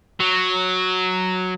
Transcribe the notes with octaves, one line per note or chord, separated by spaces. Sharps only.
F#3